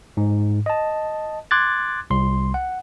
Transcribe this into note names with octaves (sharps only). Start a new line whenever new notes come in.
G#2
D#5 A5
C6 D6 F#6 G#6 A6
C2 C6
F#5